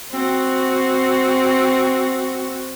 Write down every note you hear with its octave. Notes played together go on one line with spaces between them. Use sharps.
C4 F#4